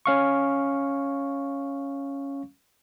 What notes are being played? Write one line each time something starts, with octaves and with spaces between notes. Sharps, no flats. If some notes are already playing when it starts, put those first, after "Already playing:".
C#4 F5 C#6